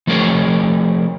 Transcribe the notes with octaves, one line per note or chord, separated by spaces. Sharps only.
F3 A3 G#4 A#4 C#5